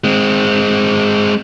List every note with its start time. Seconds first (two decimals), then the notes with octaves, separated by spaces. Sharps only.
0.04 G#3 C4